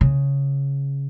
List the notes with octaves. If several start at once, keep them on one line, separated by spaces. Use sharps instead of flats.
C#3